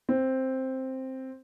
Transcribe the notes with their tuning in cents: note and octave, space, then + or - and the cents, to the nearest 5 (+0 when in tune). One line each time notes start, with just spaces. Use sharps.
C4 +5